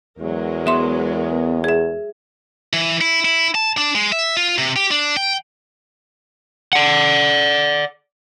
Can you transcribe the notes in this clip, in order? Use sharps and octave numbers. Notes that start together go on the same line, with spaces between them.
E2 F#3 G#3 A#4
B3 E5 C6
G#4 E5
E3
E4
E4
A5
D4
G#3
E5
F4
C3
G4
D4
G5
D5 F#5